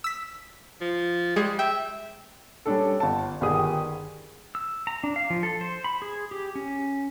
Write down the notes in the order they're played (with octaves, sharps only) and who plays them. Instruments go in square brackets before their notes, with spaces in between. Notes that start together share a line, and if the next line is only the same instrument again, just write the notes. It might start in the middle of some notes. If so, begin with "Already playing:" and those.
[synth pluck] E6 B6
[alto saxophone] F3
[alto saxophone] G3 [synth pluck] G#3 G#4
[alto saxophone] E5 [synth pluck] G5
[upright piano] G3 C#4 D4 A4
G1 A5
G1 D#3 G4 G#4 D#6
[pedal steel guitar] E6
A#5
D4
F5
F3
A4
C5
B5
G#4
G4
C#4